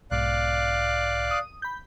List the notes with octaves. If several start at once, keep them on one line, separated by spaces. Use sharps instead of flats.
B1 G#2 D5 F5 F#6
D#6
B5 G6